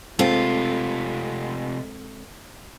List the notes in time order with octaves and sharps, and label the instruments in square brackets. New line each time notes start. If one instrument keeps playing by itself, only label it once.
[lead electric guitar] C3 A3 [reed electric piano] G#3 C4 A4 [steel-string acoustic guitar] F4